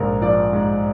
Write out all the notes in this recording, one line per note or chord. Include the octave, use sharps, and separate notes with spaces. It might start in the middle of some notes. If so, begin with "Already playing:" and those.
Already playing: A#1 G#2 A#4
F3 D5
G#2